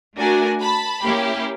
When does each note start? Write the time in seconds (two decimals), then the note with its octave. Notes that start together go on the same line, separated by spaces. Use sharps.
0.18 A3 D4 F#4 A#4 G#5
0.60 A5 B5
1.04 A#3 C#4 E4 G4